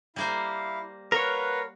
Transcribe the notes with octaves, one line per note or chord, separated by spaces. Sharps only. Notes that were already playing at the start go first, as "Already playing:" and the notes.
G3 A#3 E4 C5 F5
A#4 B4 C#5 F5 F#5